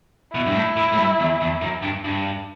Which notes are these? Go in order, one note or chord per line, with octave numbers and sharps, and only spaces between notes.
B2 E4
G2
A2
A2
A2
G2
E2
E2
F#2
G2
G2